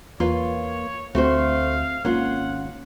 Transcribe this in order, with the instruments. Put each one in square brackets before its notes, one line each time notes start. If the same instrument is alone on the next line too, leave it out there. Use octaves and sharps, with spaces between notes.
[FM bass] E2 [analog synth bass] A#3 [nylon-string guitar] F4 B4 [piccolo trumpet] C#5
[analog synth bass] D2 [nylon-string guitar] A3 F#4 C5 [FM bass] C4 [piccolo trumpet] F5
[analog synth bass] G#1 [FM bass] A#3 [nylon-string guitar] C#4 F4 [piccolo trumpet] F#5